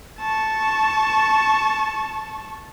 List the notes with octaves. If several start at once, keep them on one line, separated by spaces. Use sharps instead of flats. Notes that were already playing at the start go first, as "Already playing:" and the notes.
A5 C#6